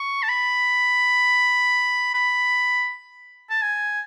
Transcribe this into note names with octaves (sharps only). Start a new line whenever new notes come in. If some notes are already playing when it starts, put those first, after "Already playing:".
Already playing: C#6
A5
B5
B5
A5
G#5